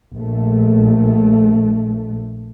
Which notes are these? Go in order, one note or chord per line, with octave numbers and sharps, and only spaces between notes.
A#1 A3